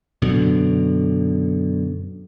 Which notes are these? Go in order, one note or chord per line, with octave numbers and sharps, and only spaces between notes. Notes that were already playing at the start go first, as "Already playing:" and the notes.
F#2 B2 D3